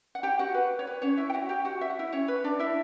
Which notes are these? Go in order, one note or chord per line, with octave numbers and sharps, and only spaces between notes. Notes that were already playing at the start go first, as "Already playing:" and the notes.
F#5
G4 G5
F#4 F#5
B4
C#5
B4
C#4 C#5
E4 E5
G5
F#4 F#5
G4 G5
F#4 F#5
E5
F#5
E4 E5
C#4 C#5
B4
D4 D5
E4 E5